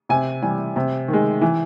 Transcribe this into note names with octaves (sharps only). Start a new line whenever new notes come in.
C3 G#5
E3 G3 G#5
C3
D#3
G#3
E3